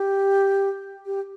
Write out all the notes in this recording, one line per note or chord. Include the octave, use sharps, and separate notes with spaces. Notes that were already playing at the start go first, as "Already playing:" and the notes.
Already playing: G4
G4